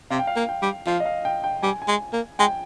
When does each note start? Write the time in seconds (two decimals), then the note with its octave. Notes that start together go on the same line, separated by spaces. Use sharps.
0.10 C3 F5
0.19 G5
0.27 F5
0.36 A#3
0.49 G5
0.62 G3
0.86 F3 F5
1.00 D#5
1.05 F5
1.25 G5
1.44 G5
1.62 G3 G#5
1.82 G#5
1.88 G#3
2.13 A#3
2.39 G#3 G5